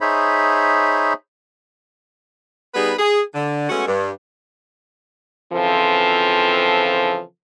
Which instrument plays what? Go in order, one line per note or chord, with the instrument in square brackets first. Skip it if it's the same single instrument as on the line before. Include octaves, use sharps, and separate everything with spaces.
[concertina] D#4 G#4 C5 C#5 E5 B5
[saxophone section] G3 B3 D#4 G#4 B4
G#4
D3
G#3 A3 B3 C#4 F#4
G2
[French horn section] C#3 E3 F3 C4 F4 A4